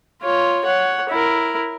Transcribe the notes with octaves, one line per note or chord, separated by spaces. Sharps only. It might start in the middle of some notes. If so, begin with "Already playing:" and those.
F4 C#5
C#5 F#5
E4 A#4